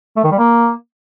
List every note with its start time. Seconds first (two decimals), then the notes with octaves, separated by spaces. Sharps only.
0.16 A3
0.24 D#3
0.31 G3
0.39 A#3